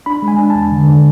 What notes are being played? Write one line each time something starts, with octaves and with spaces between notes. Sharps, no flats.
D4 B5
G#3
G#5
D4
A5
E2
D3
D3